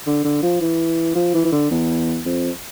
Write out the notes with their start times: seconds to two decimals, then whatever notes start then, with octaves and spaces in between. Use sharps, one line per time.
0.06 D3
0.25 D3
0.42 F3
0.61 E3
1.15 F3
1.34 E3
1.45 E3
1.52 D3
1.71 E2
2.25 F2